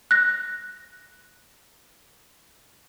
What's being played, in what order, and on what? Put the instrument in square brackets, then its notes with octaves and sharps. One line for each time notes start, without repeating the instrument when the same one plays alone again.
[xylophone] F#6 A#6